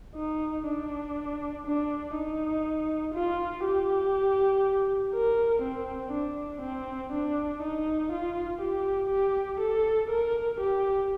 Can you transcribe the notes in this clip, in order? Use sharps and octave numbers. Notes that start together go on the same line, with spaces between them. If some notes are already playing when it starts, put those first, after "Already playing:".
D#4
D4
D4
D#4
F4
G4
A#4
C4
D4
C4
D4
D#4
F4
G4
G4
A4
A#4
G4